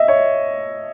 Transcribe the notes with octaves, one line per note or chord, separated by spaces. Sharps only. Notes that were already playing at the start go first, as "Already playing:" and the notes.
Already playing: D#5 E5
C#5